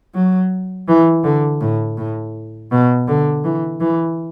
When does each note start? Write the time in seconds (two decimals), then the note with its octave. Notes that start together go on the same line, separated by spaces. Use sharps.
0.14 F#3
0.88 E3
1.24 D3
1.61 A2
1.97 A2
2.72 B2
3.08 D3
3.44 E3
3.80 E3